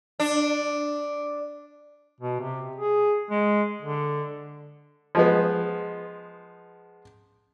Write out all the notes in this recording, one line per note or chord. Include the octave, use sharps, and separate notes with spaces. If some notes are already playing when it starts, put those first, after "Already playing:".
D4
B2
C3
G#4
G#3
D3
F3 G#3 B3